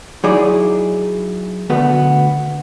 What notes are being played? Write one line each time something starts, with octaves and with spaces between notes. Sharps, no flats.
F#3 D#4 E4 G#4 D5
D2 B2 A3 B3